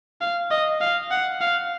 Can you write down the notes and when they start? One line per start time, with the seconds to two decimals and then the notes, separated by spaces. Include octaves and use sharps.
0.21 F5
0.51 D#5
0.81 F5
1.11 F#5
1.41 F5